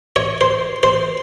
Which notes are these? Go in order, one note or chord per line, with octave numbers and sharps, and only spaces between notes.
C#5
C5
C5